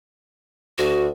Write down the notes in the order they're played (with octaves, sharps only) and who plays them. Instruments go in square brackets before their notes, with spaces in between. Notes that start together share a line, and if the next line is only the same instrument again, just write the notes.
[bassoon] D2 [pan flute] F#4